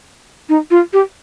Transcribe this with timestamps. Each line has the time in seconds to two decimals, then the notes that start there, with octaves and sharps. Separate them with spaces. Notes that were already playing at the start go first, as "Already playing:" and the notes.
0.49 D#4
0.71 F4
0.93 G4